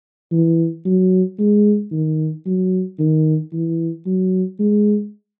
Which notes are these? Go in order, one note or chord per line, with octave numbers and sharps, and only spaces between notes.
E3
F#3
G#3
D#3
F#3
D#3
E3
F#3
G#3